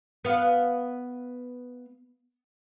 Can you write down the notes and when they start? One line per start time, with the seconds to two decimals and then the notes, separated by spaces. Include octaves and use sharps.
0.25 B3 F5